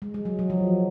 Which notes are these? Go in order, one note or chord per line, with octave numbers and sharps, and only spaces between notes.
G#3
G#3
F#3
F#3
F3